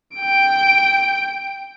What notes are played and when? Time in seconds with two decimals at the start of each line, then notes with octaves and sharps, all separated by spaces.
0.17 G5 D7